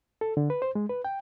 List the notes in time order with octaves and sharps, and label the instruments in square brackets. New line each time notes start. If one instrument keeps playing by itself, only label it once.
[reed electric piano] A4
D3
B4
C5
G#3
B4
G5